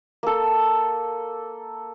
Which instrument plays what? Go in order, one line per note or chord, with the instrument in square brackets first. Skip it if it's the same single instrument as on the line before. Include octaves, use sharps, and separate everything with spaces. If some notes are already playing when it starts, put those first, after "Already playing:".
[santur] A#3 A4